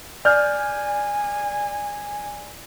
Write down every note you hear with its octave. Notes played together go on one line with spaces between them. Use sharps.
D5 G#5 F6 G6